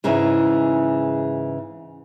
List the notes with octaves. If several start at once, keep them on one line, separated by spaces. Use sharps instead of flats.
G#2 C#3 E3 G#3 D#4 E4